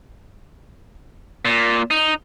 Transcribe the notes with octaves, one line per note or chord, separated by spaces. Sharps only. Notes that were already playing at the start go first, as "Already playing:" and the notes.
A#2
D#4